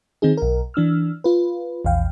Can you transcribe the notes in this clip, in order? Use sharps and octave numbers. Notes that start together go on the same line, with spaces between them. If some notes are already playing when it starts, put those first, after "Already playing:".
D#3 C4 D#4 G#4
B1 A#4
E3 D4 E6 F6
F4 B4
A#1 E2 F5 G5